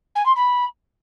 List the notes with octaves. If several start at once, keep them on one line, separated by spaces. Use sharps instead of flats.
G#5
C6
B5